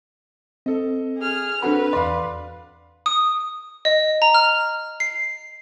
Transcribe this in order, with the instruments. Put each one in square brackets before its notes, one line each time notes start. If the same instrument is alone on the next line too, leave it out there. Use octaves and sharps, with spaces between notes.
[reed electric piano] C4 [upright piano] A4 D#5
[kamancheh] G#4 F6
[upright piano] C4 F#4 A4 [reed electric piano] D4 B5 [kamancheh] B4
[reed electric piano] E2 C6 [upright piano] D5 F5
[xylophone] D#6
D#5
A#5
F6
C7